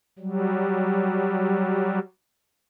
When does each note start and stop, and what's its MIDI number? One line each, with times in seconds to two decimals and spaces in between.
0.19 1.99 54
0.19 1.99 55